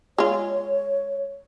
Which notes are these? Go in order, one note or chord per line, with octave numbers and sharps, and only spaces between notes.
G#3 F4 C#5